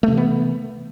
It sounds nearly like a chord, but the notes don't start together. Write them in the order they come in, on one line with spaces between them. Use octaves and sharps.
A3 C3 E3 B3